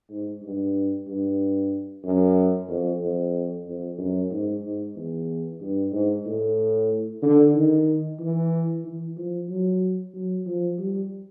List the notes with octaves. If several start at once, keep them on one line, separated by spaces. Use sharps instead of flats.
G#2
G2
G2
F#2
F2
F2
F2
F#2
G#2
G#2
E2
G2
G#2
A2
D3
D#3
E3
E3
F3
F#3
F#3
F3
G3